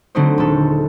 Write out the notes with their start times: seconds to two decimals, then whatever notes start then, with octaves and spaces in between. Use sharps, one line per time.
0.15 D3 F#3 A3 C4 D#4 C5
0.38 D#1 G#3 A4